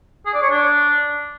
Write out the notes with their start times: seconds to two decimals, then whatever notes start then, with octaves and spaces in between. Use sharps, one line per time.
0.26 G#4
0.34 D5
0.42 C#5
0.50 D4